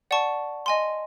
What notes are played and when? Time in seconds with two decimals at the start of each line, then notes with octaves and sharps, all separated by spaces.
0.11 D5 F#5 A5 C#6
0.66 D#5 G#5 C6